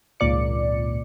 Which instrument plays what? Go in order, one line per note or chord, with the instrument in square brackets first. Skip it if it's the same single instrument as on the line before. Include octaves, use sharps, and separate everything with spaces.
[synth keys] G#1 C#2 A#2 D5 C#7